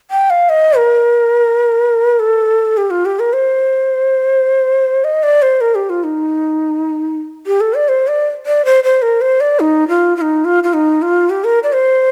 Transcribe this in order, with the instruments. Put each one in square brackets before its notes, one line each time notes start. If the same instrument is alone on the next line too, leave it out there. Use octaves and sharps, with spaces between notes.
[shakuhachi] G5
F5
D#5
A#4
A4
G4
F4
G4
A#4
C5
D#5
D5
C5
A#4
G4
F4
D#4
G4
A4
D5
C5
D5
D5
C5
C5
A#4
C5
D5
D#4
F4
F4
D#4
F4
F4
D#4
F4
G4
A#4
D5
C5